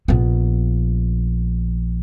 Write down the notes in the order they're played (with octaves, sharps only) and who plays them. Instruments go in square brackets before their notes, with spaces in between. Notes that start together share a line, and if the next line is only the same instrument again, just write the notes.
[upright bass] A#1 B3